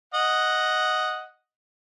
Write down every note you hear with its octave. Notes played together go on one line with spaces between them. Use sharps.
D#5 F#5